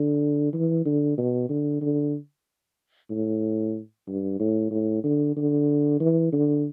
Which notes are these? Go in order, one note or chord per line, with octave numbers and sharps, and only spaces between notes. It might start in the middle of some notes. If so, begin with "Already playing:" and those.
Already playing: D3
E3
D3
B2
D3
D3
A2
G2
A2
A2
D3
D3
E3
D3